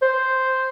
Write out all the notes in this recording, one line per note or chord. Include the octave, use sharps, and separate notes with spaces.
C5